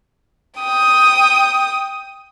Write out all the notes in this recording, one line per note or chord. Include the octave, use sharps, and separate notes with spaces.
G5 D#6